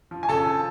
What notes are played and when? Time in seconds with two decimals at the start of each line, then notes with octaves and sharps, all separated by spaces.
0.11 F3
0.23 G#5
0.29 C#3 A4 A5
0.46 F3